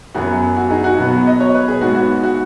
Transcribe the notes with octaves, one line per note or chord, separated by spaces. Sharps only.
F#2 F#3 B3 F#4
F#4
D#4 G#4
F#4
B2 F#3 B3
D#5
C#5
B4
G#4
G#2 G#3 B3 F#4
F#4
F#4